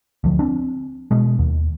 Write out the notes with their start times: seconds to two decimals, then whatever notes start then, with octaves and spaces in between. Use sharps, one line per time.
0.24 D2 F3
0.39 C4 D4
1.11 B2 G#3
1.39 D#2